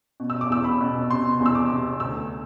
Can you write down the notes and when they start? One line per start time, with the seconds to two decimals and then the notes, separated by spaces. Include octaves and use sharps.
0.20 B2
0.30 E6
0.41 D6
0.50 E2 E6
0.64 B5
0.80 B2
1.10 C3 C6
1.40 E2
1.46 E6
1.55 D6
1.71 C3
2.00 D2 E6